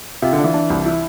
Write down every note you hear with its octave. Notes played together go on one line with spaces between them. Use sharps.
C3 F4
D3
D4
E3
D4
C2
E4